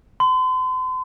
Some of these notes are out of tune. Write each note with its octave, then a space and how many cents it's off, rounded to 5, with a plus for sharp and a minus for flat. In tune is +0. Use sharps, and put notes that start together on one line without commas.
C6 -40